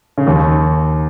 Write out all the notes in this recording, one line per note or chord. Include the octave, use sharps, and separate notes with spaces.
C#3
D#2 D#3